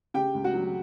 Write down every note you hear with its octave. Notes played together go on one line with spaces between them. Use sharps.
C#3 G4 G5
C#2
F#4 F#5
F#3